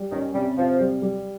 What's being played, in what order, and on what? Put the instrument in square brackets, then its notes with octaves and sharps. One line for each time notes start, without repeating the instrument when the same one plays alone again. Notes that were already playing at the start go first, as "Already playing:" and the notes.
Already playing: [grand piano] G3
[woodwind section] D#3 [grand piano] C#4
[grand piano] C3 [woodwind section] G3
[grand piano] C3 [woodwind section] F3
[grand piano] G3
G3